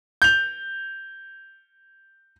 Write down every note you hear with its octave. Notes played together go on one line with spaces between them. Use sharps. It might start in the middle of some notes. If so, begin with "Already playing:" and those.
G6 F7